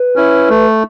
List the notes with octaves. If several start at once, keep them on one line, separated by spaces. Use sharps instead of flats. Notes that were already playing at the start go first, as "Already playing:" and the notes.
Already playing: B4
C#4 E4
A3